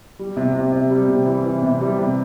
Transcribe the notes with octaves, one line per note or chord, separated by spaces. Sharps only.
G3
C3
C3
C3
G3
C3
E3
E3
C3
G3
C3